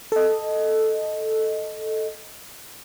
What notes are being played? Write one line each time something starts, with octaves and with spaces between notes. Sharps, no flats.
A4 D#5